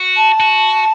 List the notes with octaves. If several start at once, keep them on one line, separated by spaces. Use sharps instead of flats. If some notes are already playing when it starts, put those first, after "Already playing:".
Already playing: F#4
A5
F#4